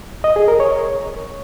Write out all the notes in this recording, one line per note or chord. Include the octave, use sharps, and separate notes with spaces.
D#5
G#4
A#4
C#5